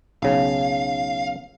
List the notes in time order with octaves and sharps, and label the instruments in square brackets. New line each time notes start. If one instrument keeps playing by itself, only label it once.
[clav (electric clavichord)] B1 C#3 [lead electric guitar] F5